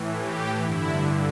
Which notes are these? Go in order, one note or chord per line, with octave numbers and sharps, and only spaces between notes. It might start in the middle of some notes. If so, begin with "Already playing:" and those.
Already playing: A2 E3
G4
G2 D3 E4